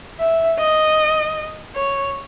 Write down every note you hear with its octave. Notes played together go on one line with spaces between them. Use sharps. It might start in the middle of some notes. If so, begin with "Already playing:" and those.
E5
D#5
C#5